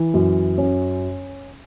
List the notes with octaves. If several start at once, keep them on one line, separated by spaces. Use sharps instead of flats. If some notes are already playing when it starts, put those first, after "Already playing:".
Already playing: E3
F#2
C#4